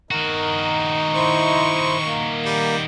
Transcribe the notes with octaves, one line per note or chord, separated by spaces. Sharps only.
D#3 D#4 F#4 A#4
E4 C5 C#6
A#3
G3